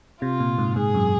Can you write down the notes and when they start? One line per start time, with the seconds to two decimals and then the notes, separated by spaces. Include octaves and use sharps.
0.22 C3 F4
0.40 A#2
0.58 G#2
0.76 G#2 G#4
0.94 F#2